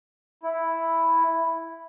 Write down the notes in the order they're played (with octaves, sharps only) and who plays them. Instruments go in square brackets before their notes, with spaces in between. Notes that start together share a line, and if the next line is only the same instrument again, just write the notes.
[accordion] E4